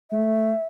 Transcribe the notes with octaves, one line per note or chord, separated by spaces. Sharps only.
A3 E5